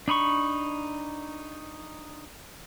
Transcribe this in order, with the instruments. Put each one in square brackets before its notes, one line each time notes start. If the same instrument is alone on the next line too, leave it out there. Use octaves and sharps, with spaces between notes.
[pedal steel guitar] D4 D#4 B5 C#6